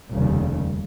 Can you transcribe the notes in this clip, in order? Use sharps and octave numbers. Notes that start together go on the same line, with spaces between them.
F1 D#2 C#3 G3